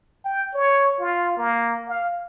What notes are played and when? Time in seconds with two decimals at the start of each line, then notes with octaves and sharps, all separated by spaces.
0.25 G5
0.54 C#5
1.00 F4
1.37 A#3
1.88 F5